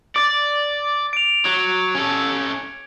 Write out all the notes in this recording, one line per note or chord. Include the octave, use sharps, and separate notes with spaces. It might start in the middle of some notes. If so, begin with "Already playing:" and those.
D5 D6 A6
D7 F7
F#3 G#6 C#7
C#4 A4